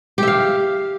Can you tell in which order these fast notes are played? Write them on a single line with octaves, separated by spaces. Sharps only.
G4 E5 F5